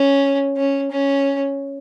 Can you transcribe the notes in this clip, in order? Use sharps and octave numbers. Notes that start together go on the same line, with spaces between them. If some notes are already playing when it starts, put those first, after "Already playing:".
Already playing: C#4
C#4
C#4